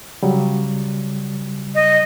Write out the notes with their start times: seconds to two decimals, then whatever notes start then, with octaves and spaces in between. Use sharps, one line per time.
0.23 C#3 F#3 G3
1.75 D#5